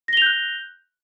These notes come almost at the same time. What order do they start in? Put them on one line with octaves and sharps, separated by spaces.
A#6 G7 F7 G6 F#6